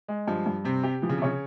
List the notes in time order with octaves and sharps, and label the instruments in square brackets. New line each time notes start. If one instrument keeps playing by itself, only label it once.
[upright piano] G#3
[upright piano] G2 [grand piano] F3
[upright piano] G2
[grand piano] C3 [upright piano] C4
[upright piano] G4
[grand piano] E3 [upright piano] F3
[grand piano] C#3
C3
[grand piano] C#3 [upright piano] C#5